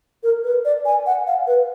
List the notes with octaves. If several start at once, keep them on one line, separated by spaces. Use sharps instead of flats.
A#4
B4
D5
G#5
F#5
F5
B4